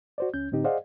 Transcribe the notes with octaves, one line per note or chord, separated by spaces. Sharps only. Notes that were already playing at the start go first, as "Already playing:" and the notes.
F#4 C5 D5
C#2 C#4 G6
A2 D3 C4 D#4 G4
G#4 C5 D5 D#5 F5 F#5